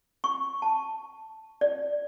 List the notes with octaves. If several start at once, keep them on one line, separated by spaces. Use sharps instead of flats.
C#6
A5
D5